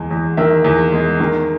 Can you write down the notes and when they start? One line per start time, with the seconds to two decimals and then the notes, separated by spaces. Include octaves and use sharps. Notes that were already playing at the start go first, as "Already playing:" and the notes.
Already playing: E2 G#3
0.11 E2
0.37 D#3 E5
0.65 E2
0.92 G#3
1.20 D#3